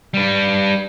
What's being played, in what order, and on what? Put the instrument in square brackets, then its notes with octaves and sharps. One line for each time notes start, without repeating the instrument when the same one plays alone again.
[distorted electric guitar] G3 B4